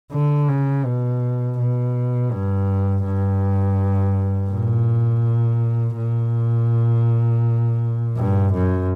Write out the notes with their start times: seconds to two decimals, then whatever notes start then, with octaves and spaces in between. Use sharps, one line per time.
0.12 D3
0.49 C#3
0.85 B2
1.58 B2
2.31 G2
3.05 G2
4.51 A#2
5.97 A#2
8.16 G2
8.53 F#2